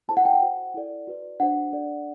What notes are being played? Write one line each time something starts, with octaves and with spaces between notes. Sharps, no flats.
E4 A4 C5 A5
F#5
G5
F#5
F#4 C5
E4 A4 D5
F#4 B4 D5
D4 F#4 C5 F#5
D4 A4 D5